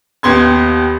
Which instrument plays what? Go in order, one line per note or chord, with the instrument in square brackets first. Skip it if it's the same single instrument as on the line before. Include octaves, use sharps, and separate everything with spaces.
[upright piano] D#2 B3 C6 G#6